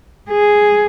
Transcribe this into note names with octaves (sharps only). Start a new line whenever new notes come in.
G#4